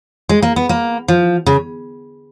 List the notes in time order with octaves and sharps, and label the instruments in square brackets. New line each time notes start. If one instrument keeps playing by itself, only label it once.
[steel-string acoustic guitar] G#3
A#3
B3
A#3
F3
C#3